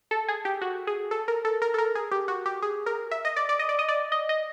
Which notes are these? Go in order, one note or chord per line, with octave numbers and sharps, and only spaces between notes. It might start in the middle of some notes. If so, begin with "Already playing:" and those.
A4
G#4
G4
F#4
G#4
A4
A#4
A4
A#4
A4
A#4
G#4
G4
F#4
G4
G#4
A#4
E5
D#5
D5
D5
D#5
D5
D#5
D5
D#5
D#5